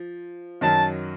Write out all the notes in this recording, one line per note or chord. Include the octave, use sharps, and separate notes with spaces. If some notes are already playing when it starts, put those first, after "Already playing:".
Already playing: F3
F#2 D#3 F#3 A5